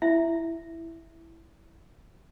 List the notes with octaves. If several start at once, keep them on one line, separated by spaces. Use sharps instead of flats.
E4 E5